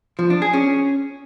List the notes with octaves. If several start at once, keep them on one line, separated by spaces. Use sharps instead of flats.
F3
D4
G#4
C#4